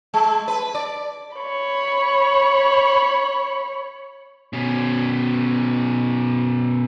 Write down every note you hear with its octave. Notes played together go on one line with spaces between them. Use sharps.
G#3
B4
D5
C#5 B5
B2 C#4